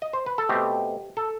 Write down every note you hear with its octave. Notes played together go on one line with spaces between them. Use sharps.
D#5
C5
B4
A4
B2 A3 C4 G4
A4